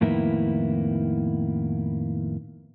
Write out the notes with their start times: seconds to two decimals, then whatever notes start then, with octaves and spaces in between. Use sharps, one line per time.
0.01 F2 A2 D#3 A#3 B3 E4